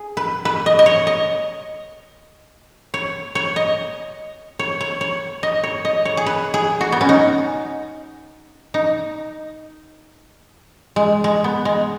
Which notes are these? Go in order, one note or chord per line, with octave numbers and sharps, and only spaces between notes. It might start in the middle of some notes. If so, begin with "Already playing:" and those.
Already playing: G#4
B4
B4
D#5
D#5
C#5
D#5
C#5
C#5
D#5
C#5
C#5
C#5
D#5
C#5
D#5
C#5
G#4
B4
G#4
F#4
B3
C#4
D#4
D#4
G#3
G#3
B3
G#3